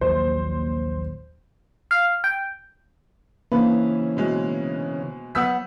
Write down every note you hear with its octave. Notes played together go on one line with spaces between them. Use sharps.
A#1 D#2 F#3 C5
F5
G5
C#3 E3 A#3 D4 B4 C5
B2 G#3
F#3 B3 F#5 D#6 E6 G6 B6